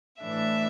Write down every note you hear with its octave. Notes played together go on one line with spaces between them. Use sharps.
A2 E3 A3 D4 E5